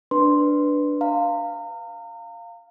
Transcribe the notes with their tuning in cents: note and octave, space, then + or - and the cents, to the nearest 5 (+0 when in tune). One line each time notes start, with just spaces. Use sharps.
D4 +0 B4 +0 C6 +0
F5 +0 A#5 -35